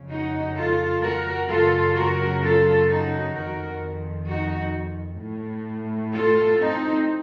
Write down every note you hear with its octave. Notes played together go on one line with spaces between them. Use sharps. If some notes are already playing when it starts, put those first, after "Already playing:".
Already playing: F2 C#3
D#4 F#4
F4 A4
F#4 A#4
F#2 C#3 F4 A4
F#4 A#4
F4 A4
D#4 F#4
F2 D#3 F#4 A#4
D#4 F#4
A2
F4 A4
C4 D#4